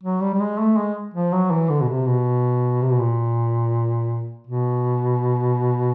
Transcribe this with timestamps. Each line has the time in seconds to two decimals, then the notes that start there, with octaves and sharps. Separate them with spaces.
0.03 F#3
0.21 G3
0.34 G3
0.40 G#3
0.59 A3
0.77 G#3
1.14 F3
1.33 F#3
1.51 E3
1.69 D3
1.81 B2
1.88 C3
2.07 B2
2.82 C3
2.91 B2
2.99 A#2
4.47 B2